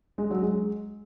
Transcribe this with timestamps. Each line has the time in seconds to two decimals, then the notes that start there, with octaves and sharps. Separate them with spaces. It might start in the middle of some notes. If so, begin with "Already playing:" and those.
0.18 G#3
0.31 F#3
0.42 G#3